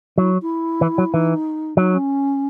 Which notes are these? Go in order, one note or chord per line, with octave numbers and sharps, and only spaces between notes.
F#3 E4
E4
E3
F#3
E3 D#4
F#3 D#4
C#4